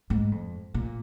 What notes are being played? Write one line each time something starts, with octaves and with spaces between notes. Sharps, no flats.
G#2
F2
A#2